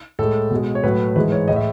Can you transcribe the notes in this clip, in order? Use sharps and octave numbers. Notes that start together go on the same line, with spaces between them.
A2 G#3 A4
B2 G#3
C#5
A2 F#3 A3 B4
G#2 E3 G#3 B4
C#5
A2 G#3 D#5
E5